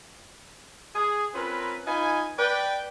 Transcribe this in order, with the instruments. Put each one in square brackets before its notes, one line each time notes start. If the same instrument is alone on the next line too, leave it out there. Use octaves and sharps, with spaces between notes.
[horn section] G#4
C4 C#4 F4 A#4 B4
D#4 F4 B4 G#5
B4 D5 G5